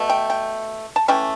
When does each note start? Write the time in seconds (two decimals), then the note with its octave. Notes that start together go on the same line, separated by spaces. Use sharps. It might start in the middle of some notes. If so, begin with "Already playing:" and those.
Already playing: B2 A3
0.09 G5
0.30 G5
0.96 A5
1.08 E3 A3 C#4 G5